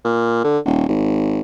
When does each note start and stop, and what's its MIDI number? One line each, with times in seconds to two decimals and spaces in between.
0.04 0.42 46
0.44 0.58 50
0.65 0.84 27
0.88 1.41 32